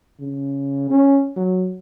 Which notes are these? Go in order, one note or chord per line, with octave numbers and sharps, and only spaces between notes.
C#3
C#4
F#3